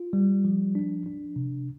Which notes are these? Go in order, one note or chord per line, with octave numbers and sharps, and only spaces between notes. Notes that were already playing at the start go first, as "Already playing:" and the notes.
Already playing: F4
G3
F3
D4
D4
C3